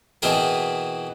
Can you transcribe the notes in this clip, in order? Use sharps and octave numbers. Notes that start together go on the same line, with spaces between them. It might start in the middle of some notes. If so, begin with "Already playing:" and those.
B2 E3 C4 E4 G#4 A#4